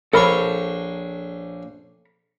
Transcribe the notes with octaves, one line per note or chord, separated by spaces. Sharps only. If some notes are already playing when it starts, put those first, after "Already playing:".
A#1 A4 A#4 C5 C#5 B5